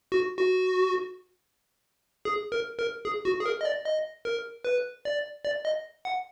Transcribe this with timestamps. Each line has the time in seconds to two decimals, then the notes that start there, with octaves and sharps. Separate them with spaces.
0.12 F#4
0.38 F#4
2.25 G#4
2.52 A#4
2.79 A#4
3.05 G#4
3.25 F#4
3.40 G#4
3.46 A#4
3.61 D#5
3.65 D5
3.85 D#5
4.25 A#4
4.65 B4
5.05 D5
5.45 D5
5.65 D#5
6.05 F#5